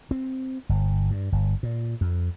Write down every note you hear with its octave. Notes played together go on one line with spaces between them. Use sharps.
C4
G1
G2
G1
A#2
F2